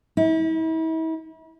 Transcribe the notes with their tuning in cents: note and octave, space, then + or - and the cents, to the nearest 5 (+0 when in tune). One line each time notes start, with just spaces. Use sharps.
E4 -40